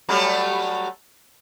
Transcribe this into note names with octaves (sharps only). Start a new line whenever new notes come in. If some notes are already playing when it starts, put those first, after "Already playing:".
F#3 G3 A3